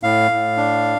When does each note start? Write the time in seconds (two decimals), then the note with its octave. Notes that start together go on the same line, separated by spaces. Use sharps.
0.03 A2 F5
0.31 A2
0.57 D4